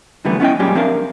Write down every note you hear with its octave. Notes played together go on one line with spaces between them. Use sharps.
F#2 D3 E3 G3 A3 B3
B3 C#4 E4 D#5 G5
F#2 A#2 G3 C#4 G4 G#4
F3 C4 D4 A#4 E5 F5